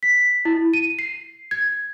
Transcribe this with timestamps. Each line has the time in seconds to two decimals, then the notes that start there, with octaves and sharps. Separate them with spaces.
0.03 B6
0.45 E4
0.74 D#7
0.99 C7
1.51 G#6